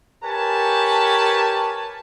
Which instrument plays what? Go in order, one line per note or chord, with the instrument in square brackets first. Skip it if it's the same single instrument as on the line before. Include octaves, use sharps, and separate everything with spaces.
[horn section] G4 A#4 B4 C#5 G#5 A5